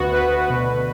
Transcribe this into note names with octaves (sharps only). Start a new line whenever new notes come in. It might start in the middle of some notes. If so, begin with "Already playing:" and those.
Already playing: D2 B3 F#4
D2 B4
B2